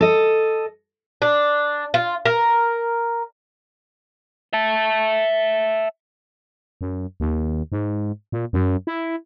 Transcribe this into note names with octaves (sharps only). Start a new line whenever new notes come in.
A4 D#5
D4
F4
A#4
E5 A5
F#2
D#2
G#2
A#2
F#2
E4